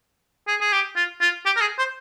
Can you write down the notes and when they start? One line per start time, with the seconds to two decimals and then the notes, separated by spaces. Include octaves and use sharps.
0.48 G#4
0.61 G#4
0.72 G4
0.96 F4
1.21 F4
1.46 G4
1.56 A#4
1.61 G#4
1.78 C5